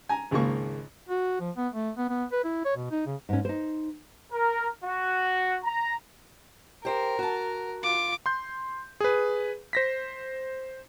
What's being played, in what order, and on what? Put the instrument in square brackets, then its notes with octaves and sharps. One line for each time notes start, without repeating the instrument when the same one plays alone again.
[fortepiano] G#5 A#5
G#1 C#2 G#2 A#3 C#6
[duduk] F#4
F3
B3
A3
B3
B3
B4
E4
C#5
B2
D#4
C#3
[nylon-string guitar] G#2 C#4
D#4 C5
[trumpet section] A#4
F#4
A#5
[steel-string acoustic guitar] G4 C5 G5 [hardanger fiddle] A#4
[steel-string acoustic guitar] F#4 A5
[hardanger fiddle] F4 [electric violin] D6
[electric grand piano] C6 G6
G#4 B4
C5 A#6 B6